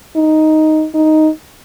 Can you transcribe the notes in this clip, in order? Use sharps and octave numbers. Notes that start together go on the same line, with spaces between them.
D#4
D#4